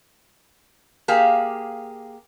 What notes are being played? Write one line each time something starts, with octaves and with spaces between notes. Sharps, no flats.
A#3 G4 G#4 F5